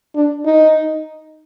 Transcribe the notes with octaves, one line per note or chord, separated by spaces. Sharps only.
D4
D#4